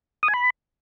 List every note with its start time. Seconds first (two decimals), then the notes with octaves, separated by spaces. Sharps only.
0.23 D#6
0.28 G#5
0.34 B5